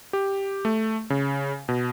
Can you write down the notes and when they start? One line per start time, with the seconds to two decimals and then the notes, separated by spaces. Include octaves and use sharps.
0.13 G4
0.65 A3
1.10 C#3
1.69 B2